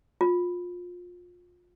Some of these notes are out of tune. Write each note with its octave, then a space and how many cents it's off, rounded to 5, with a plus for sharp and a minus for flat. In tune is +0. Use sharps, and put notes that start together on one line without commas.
F4 +25